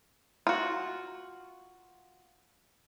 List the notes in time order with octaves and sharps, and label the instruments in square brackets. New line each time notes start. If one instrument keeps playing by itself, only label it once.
[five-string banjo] F4 F#4